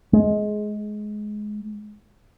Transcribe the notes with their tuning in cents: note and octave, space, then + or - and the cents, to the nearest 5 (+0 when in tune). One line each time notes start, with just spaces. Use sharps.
G#3 +20